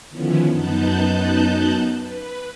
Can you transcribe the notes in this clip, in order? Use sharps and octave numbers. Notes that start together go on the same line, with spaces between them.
D3 D#3 F3 B3 C#4 E4
F#2 B3 D#4 A5 F#6 G6
B4